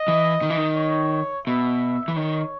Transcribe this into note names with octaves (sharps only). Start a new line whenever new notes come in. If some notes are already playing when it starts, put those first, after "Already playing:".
Already playing: D#5
E3
D#3
E3
D#3
C#5
B2 E5
E3
D#3 C#5